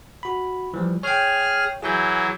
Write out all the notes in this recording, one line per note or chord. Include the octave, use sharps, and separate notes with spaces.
F#4 B5
E3 F3 G3
G#4 C#5 G5 F6
E3 F#3 G#4 G#5 G6